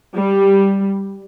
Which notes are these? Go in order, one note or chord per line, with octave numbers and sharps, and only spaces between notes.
G3